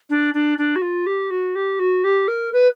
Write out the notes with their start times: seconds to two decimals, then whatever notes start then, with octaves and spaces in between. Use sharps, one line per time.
0.10 D4
0.34 D4
0.58 D4
0.76 F#4
0.82 F4
1.06 G4
1.30 F#4
1.55 G4
1.79 F#4
2.04 G4
2.28 A#4
2.53 B4